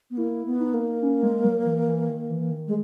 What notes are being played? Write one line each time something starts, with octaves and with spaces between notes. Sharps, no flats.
B3
A#3 E4
B3
D#4
A#3
C#4
G#3
F#3
E3
E3
D#3
E3
D#3
G#3